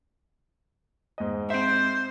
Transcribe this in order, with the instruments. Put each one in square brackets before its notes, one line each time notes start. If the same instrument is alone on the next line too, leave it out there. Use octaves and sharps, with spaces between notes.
[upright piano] G#2 D#5
[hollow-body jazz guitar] C4 E5 [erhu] C5